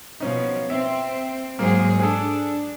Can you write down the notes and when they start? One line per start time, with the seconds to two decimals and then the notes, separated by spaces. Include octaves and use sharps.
0.20 B2 F3 C#4 D#4
0.70 C4 E5
1.59 G#2 F#3 A#3 G#4 C5
2.00 D4 G#4 A4